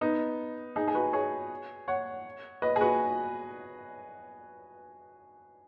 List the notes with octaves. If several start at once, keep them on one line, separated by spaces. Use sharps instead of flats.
B3 D#4
D#4 G#4
G#4
F#4 B4
G#4 C#5
C#5 F#5
B4 D#5
G#4
F#4 B4